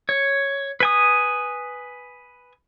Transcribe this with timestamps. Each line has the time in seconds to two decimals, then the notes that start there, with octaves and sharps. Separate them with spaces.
0.09 C#5
0.80 B4 G#5 D#6